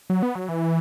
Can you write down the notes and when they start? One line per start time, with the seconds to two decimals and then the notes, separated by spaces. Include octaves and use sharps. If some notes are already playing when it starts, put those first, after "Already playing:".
0.10 F#3
0.23 B3
0.35 F#3
0.49 E3